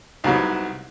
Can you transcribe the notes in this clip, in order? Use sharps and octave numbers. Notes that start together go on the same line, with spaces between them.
C2 G#2 F#3 B3